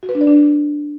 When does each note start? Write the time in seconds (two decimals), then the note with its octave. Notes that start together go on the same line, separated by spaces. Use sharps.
0.03 F#4
0.09 B4
0.15 D4
0.21 D5
0.27 D4